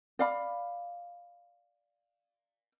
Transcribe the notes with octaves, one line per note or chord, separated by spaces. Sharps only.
D5 F5 B5